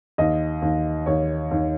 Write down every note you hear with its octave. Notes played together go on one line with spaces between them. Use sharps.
D#2 D#5
D#2
D#2 C#5
D#2